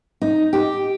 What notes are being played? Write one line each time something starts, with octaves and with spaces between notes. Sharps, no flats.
D#4
G4